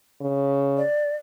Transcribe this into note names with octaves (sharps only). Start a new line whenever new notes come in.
C#3
D5